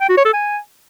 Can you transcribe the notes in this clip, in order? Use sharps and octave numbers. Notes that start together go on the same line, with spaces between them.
G5
F#4
C#5
A4
G#5